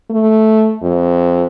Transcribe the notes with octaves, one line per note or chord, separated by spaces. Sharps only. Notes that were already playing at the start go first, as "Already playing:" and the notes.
A3
F2